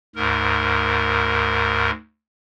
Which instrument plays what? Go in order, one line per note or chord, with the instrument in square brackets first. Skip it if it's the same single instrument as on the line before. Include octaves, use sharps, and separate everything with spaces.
[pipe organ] D2 G#2 A#4